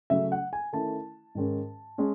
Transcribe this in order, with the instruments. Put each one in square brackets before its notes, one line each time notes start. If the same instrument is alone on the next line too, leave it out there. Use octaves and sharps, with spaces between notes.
[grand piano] C#3 F#3 A3 E5
F#5
G#5
D#3 A3 C#4 E4 A5
G#2 D#3 G#3 C#4
G#3 C#4